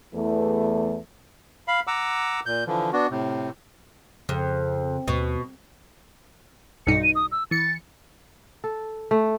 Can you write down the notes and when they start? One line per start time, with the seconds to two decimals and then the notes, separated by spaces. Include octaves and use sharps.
0.14 E2 E3 A3
1.68 F5 B5
1.87 F#5 A#5 D6 E6
2.46 A#2 G6
2.67 D3 E3 F3
2.93 B3 D4 F#4
3.10 A2 C3
4.29 F2 C#3
5.08 D#2 B2
6.87 B1 G2 D#4 C#7
7.03 D#7
7.16 D#6
7.32 E6
7.51 E3 A6 C#7
8.64 A4
9.11 A3